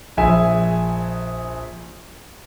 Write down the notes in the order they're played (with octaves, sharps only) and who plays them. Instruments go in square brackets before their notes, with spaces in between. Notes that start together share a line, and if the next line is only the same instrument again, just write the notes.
[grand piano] A#1 G#4 E5 G#5